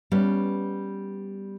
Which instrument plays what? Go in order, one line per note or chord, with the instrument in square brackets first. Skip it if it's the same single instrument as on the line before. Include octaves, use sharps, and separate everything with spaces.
[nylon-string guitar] G3 B3 C#4